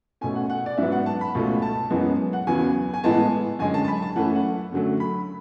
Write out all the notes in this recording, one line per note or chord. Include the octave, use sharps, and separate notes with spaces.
B2 A3 C#4 G#5
F#5
F#5
D5
G#2 F#3 B3 E5
F#5
A5
B5
C#2 B2 A3 C#4
A5
F#2 E3 G#3 B3
F#5
E2 C#3 F#3 B3 G#5
G#5
A2 E3 G#3 B3 A5
F#2 D3 G#3 G#5
A5
A5
B5
A5
F#2 E3 A3 C#4 F#5
F#5
F#2 D3 F#3 A3
B5